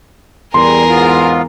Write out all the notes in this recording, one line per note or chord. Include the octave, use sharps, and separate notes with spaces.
E2 G3 G#4 A#4 C6
G#2 B3 F4